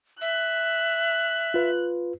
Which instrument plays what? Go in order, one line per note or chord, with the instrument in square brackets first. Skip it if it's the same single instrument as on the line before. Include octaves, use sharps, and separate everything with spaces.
[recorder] E5 [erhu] F#6
[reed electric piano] F4 B4